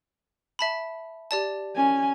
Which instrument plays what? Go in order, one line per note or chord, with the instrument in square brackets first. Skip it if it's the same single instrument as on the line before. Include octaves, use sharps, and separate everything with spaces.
[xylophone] E5 A5 B5
G4 D5 A5
[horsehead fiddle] C#4 G#5